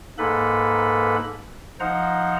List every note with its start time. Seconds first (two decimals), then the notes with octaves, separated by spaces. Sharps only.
0.18 G#2 A#3 A4 B4 B5
1.80 F3 D#4 C5 F#5 A#5